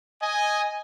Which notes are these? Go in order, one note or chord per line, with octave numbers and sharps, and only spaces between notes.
D#5 G#5